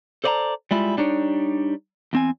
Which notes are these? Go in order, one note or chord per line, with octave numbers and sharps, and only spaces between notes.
A4 C5 D5 D#5 A5 A#5
G3 G#3 E4 F4
G3 D4 D#4 C#5
E2 C4 G#5